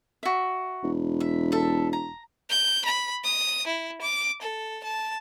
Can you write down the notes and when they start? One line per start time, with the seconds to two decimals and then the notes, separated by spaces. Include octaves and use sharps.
0.23 F#4 E5
0.83 E1
1.20 E5
1.52 A4 E5
1.93 A#5
2.50 G6
2.85 B5
3.24 D#6
3.67 E4
4.01 D6
4.42 A4
4.84 A5